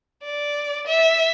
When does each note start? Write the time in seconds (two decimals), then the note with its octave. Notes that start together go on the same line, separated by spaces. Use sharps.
0.24 D5
0.86 E5